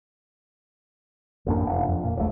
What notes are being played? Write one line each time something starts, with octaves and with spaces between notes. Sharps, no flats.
A1 F#2 A#3 D4
F1
F2
A#2
D#1 A#1 C3 A3